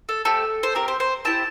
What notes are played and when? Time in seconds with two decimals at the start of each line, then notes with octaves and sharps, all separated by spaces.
0.09 A4
0.25 A3 C4 G4 A4
0.63 C5
0.75 C4 G4 A#4
0.88 C5
1.00 C5
1.25 C4 E4 G4 A5